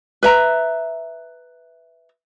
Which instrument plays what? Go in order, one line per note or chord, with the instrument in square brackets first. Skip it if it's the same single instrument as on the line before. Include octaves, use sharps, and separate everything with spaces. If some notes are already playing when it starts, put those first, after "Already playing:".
[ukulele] B4 E5 A#5